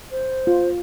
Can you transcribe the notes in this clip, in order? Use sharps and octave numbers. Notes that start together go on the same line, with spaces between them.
C5
F4